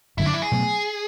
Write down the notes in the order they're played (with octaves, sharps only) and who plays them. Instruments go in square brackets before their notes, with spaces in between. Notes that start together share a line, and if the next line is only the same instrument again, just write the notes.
[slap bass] F#1 F#2 D3 F#3 [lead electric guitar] E4
[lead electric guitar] D4
E4
G#4
[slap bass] B2 F#3 A3